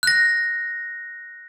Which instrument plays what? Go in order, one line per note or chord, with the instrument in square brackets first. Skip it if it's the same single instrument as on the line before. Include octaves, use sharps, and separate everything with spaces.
[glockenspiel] F#6 A#6